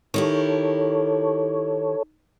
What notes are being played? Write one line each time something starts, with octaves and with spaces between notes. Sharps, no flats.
D#3 E4 G4 A4 C#5